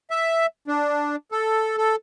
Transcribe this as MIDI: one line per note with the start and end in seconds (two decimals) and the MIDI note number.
0.11 0.46 76
0.68 1.16 62
1.32 1.76 69
1.78 1.95 69